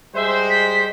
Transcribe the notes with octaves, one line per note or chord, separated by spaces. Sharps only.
G3 G#3 C5 E5
B6